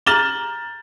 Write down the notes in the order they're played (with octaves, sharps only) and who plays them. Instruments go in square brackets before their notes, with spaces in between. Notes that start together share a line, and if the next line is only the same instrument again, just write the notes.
[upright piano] A#5 F6 A6 E7 F#7 G7